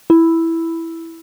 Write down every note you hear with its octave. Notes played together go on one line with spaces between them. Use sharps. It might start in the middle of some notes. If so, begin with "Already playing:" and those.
E4